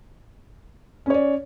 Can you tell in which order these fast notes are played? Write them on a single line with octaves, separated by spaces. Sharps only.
C#4 C#5 D5